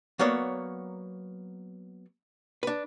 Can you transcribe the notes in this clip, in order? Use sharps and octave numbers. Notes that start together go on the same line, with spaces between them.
F#3 A#3 B3 A#4 C#5 D5
D4 B4